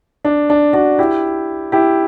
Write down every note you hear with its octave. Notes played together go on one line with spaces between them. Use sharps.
D4
D4
D4 F#4
E4 G4
E4 G4